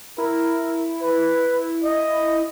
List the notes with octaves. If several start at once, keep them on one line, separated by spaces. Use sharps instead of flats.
E4 A#4
B4
D#5